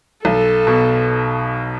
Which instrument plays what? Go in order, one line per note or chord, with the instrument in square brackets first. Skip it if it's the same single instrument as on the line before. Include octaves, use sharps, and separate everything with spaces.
[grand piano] B1 [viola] A4
[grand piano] B2